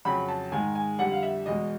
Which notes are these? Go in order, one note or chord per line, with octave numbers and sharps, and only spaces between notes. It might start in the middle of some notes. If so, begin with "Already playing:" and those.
F2 C#3 F#3 B5
A5
G#2 D#3 G#3 G#5
G#5
F2 D3 G3 F#5
F5
E5
E2 B2 G#3 D#5